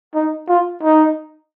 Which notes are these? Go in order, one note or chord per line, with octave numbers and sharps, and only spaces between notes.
D#4
F4
D#4